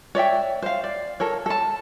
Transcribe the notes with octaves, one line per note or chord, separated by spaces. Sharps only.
C#5 D5 E5 G5
C5 F5
D5
A4 A#4 C#5
A4 A5